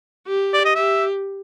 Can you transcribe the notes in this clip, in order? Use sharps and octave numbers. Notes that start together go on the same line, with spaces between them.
G4
D5
D#5
G4 E5